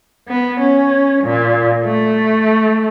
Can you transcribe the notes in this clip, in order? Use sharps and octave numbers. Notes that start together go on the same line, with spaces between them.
B3
C#4
A#2
A3